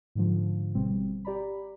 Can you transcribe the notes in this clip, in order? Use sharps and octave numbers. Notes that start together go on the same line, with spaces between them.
G#2 D3 F3
G#1 B2 G3 C4
G4 D5 A#5 B5